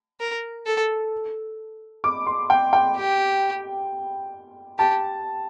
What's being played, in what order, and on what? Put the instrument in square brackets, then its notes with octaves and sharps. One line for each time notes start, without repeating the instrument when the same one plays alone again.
[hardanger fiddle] A#4
A4
[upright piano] D6
C6
G5
G5
[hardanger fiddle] G4
[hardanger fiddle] G4 [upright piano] A5